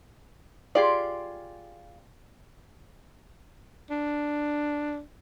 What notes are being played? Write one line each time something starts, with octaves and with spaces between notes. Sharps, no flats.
F4 G4 G#4 D5 C6
D4